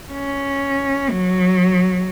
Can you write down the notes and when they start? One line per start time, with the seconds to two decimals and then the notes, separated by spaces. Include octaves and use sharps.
0.13 C#4
1.10 F#3